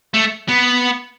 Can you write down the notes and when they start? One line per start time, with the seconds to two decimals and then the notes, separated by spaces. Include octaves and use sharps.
0.14 A3
0.48 B3